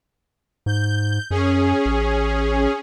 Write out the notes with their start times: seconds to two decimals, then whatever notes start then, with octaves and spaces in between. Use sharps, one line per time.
0.66 G#2 G6
1.31 F#2 C#4 G#4
1.86 A1